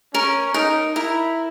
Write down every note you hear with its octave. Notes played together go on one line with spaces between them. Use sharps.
C#4 A#4
D#4 A#4
E4 A#4